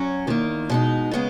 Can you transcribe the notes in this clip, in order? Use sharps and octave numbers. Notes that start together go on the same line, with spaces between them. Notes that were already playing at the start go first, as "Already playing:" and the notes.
Already playing: F#3 C#4 F#4
E2 D#3 A#3
B2 G#3 D#4
C#3 G#3 B3